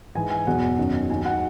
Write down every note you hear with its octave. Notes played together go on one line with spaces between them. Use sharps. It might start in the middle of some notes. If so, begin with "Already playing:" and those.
G#2 E3 G#5
G#5
E2 B2 F#3 F#5
F#2 D#3 F#3
D#2 D#3 F#3 G#5
F#5